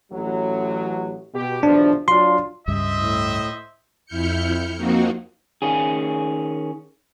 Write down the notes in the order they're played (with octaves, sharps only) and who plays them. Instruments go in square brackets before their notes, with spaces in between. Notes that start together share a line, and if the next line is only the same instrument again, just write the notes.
[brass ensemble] A1 F#3
B2 G4
[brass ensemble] B1 E2 F3 [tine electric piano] D4
[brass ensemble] F#3 D4 F4 [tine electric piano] C6
[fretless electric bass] C#2 G2 C#3 [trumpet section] C5 D#5 E5 [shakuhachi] D#6
[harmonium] A2
[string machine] F2 E4 F6 G6 C#7
F3 A#3 C4 D#4 F#4
[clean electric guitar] D#3 C#4 G#4